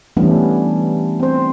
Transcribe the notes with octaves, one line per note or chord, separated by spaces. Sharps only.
E3 G3 A3 B3 C#4 D4
C4 C5